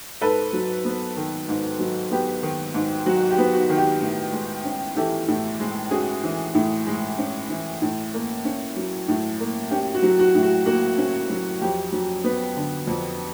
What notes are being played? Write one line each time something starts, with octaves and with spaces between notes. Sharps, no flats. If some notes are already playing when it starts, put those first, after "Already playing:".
G#2 A4 B4
F#3
B3
D#3
G#2
F#3
B3 G4
D#3
G#2
F#3 F#4
G4
B3
F#4
D#3
G4
A2
G#3
C#4
E3 G4 A4
A2
G#3
C#4 F#4 G#4
E3
A2
G#3
C#4
E3
A2
A#3
C#4
F#3
A2
A#3
C#4 G4
F#4
F#3
F#4
A2
F#4
A#3 F#4
C#4
F#3
F2 G4
F#3
B3
D3
F2